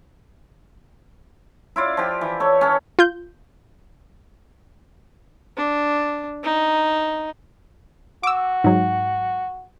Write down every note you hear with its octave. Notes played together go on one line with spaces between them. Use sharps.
E4 F4 D5
F3 G4
E3
A4 C#5
C#4 A4
F4 G6
D4
D#4
F#4 D6 E6
G#2 F#3